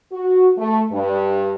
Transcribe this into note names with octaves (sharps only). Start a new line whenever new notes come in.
F#4
A3
G2